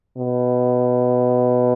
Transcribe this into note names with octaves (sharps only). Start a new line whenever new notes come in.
B2